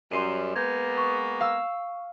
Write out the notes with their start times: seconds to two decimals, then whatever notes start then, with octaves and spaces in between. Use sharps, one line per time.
0.11 F#2 G3 C6 C7 D#7
0.56 G#3 A#3 B3 G6 G#6
0.98 C#6
1.40 F5 E6